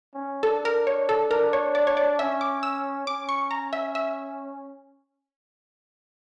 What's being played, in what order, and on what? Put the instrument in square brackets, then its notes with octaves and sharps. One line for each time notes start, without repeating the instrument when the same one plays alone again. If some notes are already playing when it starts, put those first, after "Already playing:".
[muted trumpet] C#4
[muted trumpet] D4 [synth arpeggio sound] A4
[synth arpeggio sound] A#4
C#5
A4
[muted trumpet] D4 [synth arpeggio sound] A#4
[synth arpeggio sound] C#5
D5
C#5
D5
[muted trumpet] C#4 [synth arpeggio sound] E5
[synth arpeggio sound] D6
E6
[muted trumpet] C#4 [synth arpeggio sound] D6
[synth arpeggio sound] C#6
A#5
E5
E5